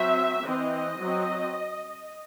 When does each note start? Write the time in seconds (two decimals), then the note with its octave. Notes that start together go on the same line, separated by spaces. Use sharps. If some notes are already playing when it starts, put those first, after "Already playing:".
Already playing: F#3 C4 E5
0.44 E3 C4 D#5
0.99 F#3 C4